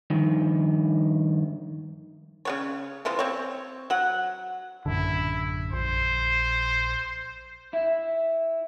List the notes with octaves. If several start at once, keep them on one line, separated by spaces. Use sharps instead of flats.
G2 D#3 F3
C#3 B3 C#5
C3 E3 F3 F4
C4 C#5
F#3 F#5
A1 F#2 D3 E4
A#1 C5
E4 E5